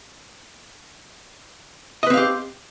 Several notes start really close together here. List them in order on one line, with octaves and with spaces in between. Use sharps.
D#5 B4 C4 F5 G4